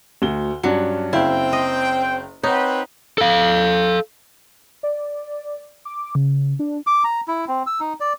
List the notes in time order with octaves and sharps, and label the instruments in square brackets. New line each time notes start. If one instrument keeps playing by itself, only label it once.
[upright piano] D2 F#4 G7
[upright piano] G2 C#4 D4 [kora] F#3
[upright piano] F#1 F5 [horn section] C4 G5 [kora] E4
[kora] D#5
[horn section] C4 B4 [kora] D#4 [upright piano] C#5 F#5
[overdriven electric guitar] A4 F5
[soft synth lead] D5
D6
C#3
D4
[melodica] D6
A#5
E4
C4
E6
D#4
D5